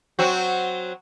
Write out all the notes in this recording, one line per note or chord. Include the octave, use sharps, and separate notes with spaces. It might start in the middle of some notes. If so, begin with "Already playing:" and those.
F#3 C4 F#4